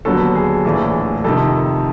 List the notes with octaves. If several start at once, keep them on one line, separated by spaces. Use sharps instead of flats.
D#2 D3 F#3 B3 A4
G#4
A#1 A2 E3 A3 D4
F2 C3 D#3 A4